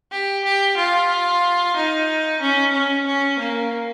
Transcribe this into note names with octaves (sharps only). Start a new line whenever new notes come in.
G4
G4
F4
D#4
C#4
C#4
C#4
A#3